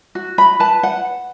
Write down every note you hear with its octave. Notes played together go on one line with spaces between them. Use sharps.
F#4
B5
B4 A5
F#5